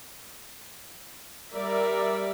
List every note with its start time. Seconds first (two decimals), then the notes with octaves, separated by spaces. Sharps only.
1.53 G3 A#4 D5 E5